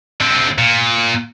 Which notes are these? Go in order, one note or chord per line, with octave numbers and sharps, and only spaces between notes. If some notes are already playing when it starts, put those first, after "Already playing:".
D3 C4
A#2